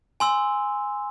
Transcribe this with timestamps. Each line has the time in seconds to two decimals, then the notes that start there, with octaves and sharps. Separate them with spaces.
0.20 G#5 C6 E6